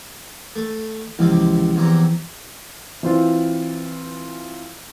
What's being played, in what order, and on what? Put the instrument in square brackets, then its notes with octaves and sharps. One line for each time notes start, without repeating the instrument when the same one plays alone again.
[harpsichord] A3
[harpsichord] C#2 C3 F5 [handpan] E3 F3 E4
[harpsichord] E2 C3 A#5
[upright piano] E3 C4 F4